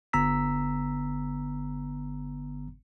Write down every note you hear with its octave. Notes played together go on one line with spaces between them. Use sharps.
G1 D3 B3 A#5 E6 B6